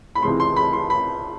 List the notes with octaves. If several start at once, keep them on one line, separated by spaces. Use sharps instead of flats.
B5
C#2 C3 E3 G#3 C6
C6
B5
C6
B5